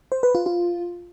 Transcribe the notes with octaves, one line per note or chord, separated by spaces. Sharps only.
C5
B4
F4
F4